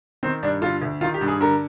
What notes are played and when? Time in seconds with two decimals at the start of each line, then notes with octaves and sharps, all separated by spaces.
0.23 D#3 C4
0.43 G2 D4
0.62 D3 F4
0.81 D2
1.01 D#3 F4
1.14 G4
1.21 G2
1.28 G#4
1.41 D3 A#4